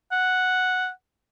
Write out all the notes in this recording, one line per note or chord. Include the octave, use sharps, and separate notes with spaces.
F#5